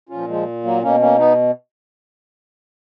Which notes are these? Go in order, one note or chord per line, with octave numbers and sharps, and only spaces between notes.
A#2 F3 C#4 F4
F3 G#3
F#3 A#3
B2 A#3 C#4
A#3 C#4
B3 D#4